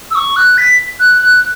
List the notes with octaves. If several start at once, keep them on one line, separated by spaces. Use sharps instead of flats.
E6
C#6
F#6
B6
F#6
F#6